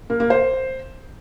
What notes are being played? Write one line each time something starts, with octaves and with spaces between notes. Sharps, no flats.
A#3
A#3
C5